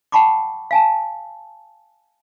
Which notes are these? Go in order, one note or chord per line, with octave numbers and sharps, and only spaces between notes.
F#5 G5 A5 B5 C#6 D6
F5 G#5 A5